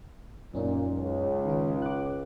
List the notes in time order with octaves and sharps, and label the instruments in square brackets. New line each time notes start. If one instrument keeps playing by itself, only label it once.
[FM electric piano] F#2 C#4 D#4 [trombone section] A#2
[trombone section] C#2
[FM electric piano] D#3 F4
D6 F#6